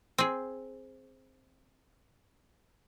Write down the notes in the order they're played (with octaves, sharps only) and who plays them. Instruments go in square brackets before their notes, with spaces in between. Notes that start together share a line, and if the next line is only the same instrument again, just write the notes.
[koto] C4 G#4